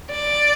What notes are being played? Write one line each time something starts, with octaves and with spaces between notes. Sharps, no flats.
D5